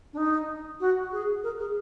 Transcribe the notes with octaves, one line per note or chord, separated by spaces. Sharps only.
D4
D#4
F#4
G#4
A#4
G#4